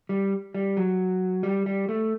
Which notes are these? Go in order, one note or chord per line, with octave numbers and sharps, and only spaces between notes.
G3
G3
F#3
G3
G3
A3